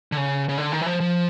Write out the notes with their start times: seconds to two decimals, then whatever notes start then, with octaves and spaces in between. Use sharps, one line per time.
0.12 D3
0.17 C#3
0.49 C#3
0.58 D3
0.72 D#3
0.81 E3
0.86 F3
1.00 F3